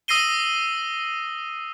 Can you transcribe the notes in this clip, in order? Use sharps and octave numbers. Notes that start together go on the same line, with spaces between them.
D#6 E6 A#6 C7 D#7 G7